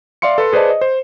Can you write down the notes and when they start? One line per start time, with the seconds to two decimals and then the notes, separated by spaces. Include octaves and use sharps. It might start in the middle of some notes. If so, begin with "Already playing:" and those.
0.22 D5 E5 F5 C6 C#7
0.38 A4 B4 C6
0.53 G#4 B4 C5 D5 D#5 A5
0.70 D#5
0.81 C5